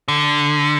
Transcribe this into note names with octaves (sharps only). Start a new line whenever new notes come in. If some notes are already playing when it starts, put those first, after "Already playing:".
D3